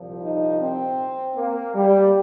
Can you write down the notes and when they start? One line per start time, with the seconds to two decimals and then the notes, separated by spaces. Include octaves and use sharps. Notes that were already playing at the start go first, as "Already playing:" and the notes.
Already playing: C2 A#2 F3
0.22 D#4
0.61 C4
1.36 A#3
1.74 G3